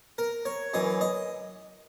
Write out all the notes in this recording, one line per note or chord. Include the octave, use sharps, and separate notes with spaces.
A#4
C#5
F#2 E3 D#5
D#5